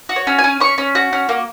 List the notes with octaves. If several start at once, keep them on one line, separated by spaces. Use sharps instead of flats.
F#4
C#5
C#4
G#5
C#4
C#4 C#6
C#4
F#4
C#4
A#3